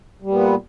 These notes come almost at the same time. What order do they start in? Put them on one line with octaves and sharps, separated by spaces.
G3 A#2 B3